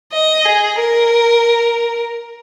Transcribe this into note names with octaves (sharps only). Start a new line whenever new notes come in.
D#5
G#4
A#4